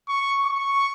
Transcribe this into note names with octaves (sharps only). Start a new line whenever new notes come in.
C#6
C#6